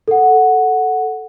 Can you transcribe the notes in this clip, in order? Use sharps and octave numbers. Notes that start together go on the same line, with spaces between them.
A4 F#5